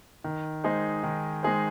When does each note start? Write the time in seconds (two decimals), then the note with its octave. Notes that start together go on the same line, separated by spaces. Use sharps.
0.24 D#3
0.64 G#3 D#4 G#4 C5
1.03 D#3
1.43 G#3 D#4 G#4 C5